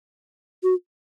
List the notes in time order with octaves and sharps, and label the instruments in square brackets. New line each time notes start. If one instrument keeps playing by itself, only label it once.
[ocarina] F#4